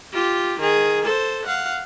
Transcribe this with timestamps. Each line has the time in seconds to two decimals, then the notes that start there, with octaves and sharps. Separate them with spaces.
0.13 F4 G4
0.60 D#3 G#4
1.05 A4 C5
1.45 F5 F#5